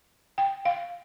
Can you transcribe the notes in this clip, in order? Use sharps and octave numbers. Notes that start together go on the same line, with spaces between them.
G5
F5